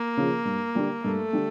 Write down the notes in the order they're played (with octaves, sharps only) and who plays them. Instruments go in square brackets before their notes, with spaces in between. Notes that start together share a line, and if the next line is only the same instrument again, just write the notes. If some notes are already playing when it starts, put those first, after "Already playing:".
Already playing: [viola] A#3
[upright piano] C#3 F3
G2
D3 G3
[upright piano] G2 [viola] A3
[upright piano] D3 G3